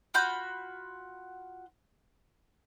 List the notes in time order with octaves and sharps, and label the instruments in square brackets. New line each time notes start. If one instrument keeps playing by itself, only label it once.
[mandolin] F4 F#4 B5 G6